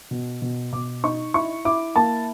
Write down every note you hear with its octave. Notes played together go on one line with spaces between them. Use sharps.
B2
B2
B2 D6
D#4 C#6
E4 C#6
E4 D6
A#3 A5